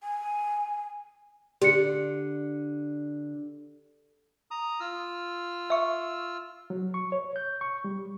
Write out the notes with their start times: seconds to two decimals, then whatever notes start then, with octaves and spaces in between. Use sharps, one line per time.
0.03 G#5
1.62 D3 G4 C#7
4.51 A#5 D#6
4.80 F4 E6 F6
5.70 E5 C#6
6.70 F#3
6.94 C#6
7.12 C#5
7.36 G6
7.61 C#6
7.84 G3